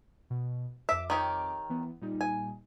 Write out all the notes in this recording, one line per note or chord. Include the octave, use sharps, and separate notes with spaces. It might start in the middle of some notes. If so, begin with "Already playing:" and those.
B2
F2 E5 D6
D#3 G4 C#5
E3 B3
A#2 G3 D#4
G#5